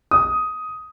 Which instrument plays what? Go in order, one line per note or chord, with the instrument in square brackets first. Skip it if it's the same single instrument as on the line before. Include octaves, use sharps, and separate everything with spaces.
[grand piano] D#6